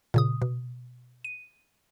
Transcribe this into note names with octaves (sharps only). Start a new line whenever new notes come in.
A#2 C#3 D#6
B2
D#7